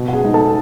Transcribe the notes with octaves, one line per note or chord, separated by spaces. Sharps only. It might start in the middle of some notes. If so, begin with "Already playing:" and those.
Already playing: B2
F#5
G#4 G#5
G#3 D#4
A4 A5